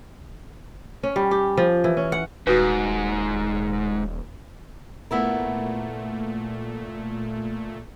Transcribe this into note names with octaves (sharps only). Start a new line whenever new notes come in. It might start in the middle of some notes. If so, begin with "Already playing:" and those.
C#4
G3
G4
F3
E3
C#4
F#5
D#1 G#2 F#4 B4
A#2 A3 B3 E4 A#4